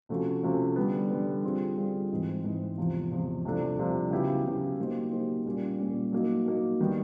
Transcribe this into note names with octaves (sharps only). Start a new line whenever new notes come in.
C3 F3 A3 C#4 F#4
C3 F3 A3 C#4 F#4
D3 G3 B3
D3 G3 B3
D3 G3 C4 F4 G#4
D3 G3 C4 F4 G#4
G#2 E3 G#3 C4 D#4
G#2 E3 G#3 C4 D#4
E2 C3 F3
E2 C3 F3
C2 C3 F3 A3 D4
C2 C3 F3 A3 D4
C#3 F#3 B3 E4 G4
C#3 F#3 B3 E4 G4
F#3 A#3 D#4 G4 C5
F#3 A#3 D#4 G4 C5
A#2 G3 A#3 C#4
A#2 G3 A#3 C#4
F#3 A#3 D#4
F#3 A#3 D#4
D#3 G3 B3